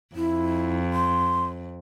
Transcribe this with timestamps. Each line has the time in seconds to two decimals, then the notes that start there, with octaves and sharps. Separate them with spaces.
0.16 F2 E4
0.93 C6